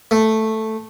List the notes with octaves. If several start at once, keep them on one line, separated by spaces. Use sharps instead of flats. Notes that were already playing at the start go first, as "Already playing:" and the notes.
A3